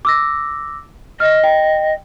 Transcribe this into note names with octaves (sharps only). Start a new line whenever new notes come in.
D6 E6 A#6
D#5 F6
G5